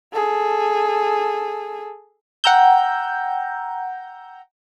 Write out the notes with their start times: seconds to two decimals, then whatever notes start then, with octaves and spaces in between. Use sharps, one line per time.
0.13 G#4 A4
2.44 F#5 G5 A#5 E6 G6